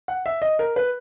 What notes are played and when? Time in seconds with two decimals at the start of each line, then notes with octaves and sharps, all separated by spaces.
0.08 F#5
0.26 E5
0.42 D#5
0.59 A#4
0.76 B4